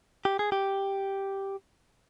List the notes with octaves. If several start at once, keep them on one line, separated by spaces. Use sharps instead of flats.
G4
G#4
G4